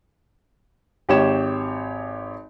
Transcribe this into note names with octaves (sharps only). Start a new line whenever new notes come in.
G#1 G4 C#5 E7